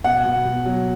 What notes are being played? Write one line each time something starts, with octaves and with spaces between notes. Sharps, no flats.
B2 F#5
B2
B2
F#3